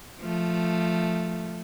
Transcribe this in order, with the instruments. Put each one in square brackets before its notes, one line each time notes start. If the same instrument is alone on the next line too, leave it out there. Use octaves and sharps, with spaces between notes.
[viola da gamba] F3 A3